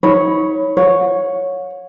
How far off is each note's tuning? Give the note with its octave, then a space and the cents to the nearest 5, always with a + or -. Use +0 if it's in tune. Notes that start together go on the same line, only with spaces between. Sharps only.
D#4 +30 C#5 +0 B5 +0
C#5 +0 F#5 -45